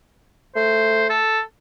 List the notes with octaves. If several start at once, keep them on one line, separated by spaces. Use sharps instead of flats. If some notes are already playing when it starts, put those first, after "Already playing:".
A3 C5
A4